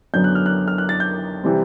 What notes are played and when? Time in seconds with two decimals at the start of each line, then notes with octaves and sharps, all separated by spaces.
0.14 F#2 D3 F#3 B3 G6
0.24 F#6
0.35 F6
0.46 F#6
0.68 F6
0.78 F#6
0.89 A6
1.00 G6
1.43 C3 E3 G3 C4